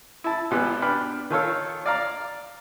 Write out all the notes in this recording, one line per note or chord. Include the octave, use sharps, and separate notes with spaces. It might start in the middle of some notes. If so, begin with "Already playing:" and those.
E4 A5
G#1 B2 G4 B4
D4 B4 G5 B5 F6
D#3 F4 A4 C#5 F5 E6
D5 F5 A#5 D6